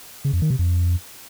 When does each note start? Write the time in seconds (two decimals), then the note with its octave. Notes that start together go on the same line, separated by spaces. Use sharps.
0.25 C#3
0.33 F2
0.42 D#3
0.50 C3
0.59 F2